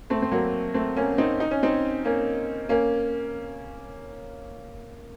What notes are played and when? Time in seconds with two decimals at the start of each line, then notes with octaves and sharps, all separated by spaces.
0.10 A3 C4
0.22 C4
0.31 F#3 A#3
0.74 A3 C4
0.97 A#3 C#4
1.18 C4 D#4
1.40 D#4
1.51 C#4
1.63 C4 D#4
2.05 A#3 C#4
2.69 A#3 C#4